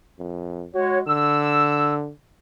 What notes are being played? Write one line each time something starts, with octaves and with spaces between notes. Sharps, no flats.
F2
G#3 F#4 C#5
D3 E6